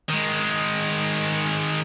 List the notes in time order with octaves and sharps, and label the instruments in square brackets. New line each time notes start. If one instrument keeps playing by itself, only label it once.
[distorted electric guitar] D#3 G#3